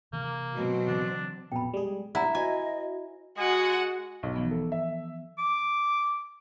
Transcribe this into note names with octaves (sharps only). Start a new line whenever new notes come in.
C3 D#3 E3 A#3
B2 F#3 C4
C#3 E3 D4
A#1 F2 B2 G5 B5
G3 G#3 G#4
C3 D4 E4 E5 F#5 A#5
F#4 C5 D#5 G#5
G#3 F#4 F#5 G#5
B1
E3 F3 B3
A4
E5
D6